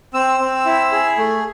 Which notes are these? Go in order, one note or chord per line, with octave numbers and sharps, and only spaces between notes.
C4 E6
C4
E4
G#4
A3